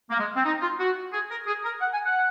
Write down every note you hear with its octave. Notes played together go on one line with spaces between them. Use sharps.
A#3
G#3
C4
D#4
F4
F#4
G#4
A#4
G#4
A#4
F#5
G#5
F#5